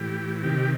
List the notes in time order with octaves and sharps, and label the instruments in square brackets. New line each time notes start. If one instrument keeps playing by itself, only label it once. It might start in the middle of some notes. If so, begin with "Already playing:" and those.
Already playing: [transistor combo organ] A2 E3 G4
C3 D#3 G4